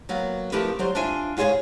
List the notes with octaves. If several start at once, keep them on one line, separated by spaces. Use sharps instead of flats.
F#3 A#3 B3
F3 A3 E4 G4 A#4 B4
F#3 G3 C5
D4 F4 E5 G#5
G#2 F4 G#4 C5 C#5 F5